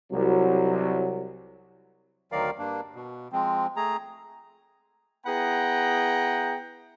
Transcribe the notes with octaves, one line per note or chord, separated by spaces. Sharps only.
C2 F#3
D2 D#3 F#3 A#4 D5 F5
G2 A#3 D4
B2
F3 G#3 C4
A3 G#4 A#5
B3 E4 G#4 F#5 G5 A#5